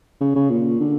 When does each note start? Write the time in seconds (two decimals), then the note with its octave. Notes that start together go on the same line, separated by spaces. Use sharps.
0.20 C#3
0.35 C#3
0.50 A#2
0.80 D3